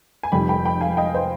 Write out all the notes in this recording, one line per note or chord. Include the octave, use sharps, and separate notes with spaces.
G#5
F1 F2 C3 D#3 G3 G5 B5
G5 B5
G5 B5
F5 G#5
D#5 G5
C5 D#5